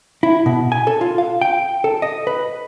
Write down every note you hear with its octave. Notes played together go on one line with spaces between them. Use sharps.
E4
B2
G#5
A4
F4
F5
G5
A4
D#5
B4